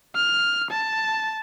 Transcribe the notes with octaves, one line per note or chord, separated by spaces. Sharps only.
F6
A5